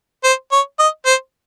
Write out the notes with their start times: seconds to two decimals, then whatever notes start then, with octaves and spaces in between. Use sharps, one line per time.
0.24 C5
0.52 C#5
0.79 D#5
1.06 C5